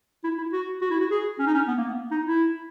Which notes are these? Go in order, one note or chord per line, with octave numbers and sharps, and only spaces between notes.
E4
E4
F#4
F#4
E4
F#4
G#4
C#4
D#4
C#4
B3
A#3
B3
D#4
E4